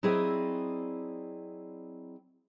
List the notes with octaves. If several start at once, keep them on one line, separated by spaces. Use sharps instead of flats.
F#3 C4 E4 G#4 D5 D#5